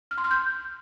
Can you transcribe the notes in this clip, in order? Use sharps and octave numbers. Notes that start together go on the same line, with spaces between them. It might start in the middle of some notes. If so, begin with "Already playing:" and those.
F6
C6
F6
G6